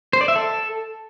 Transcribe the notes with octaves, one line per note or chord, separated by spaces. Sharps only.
C5
D5
E5
A4